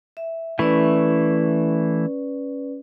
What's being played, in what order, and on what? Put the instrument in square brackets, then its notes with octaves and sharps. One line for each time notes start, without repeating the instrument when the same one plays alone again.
[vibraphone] E5
[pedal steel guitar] E3 A3 E4 [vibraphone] C#4 B4 D5